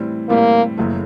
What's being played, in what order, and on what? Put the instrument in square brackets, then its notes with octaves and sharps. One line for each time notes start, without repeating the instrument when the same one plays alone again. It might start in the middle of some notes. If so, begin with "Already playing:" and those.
Already playing: [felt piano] A2 E3 G3 C4
[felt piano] A2 E3 G3 C4 [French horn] A#3
[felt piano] F#1 F#2 C#3 E3 A3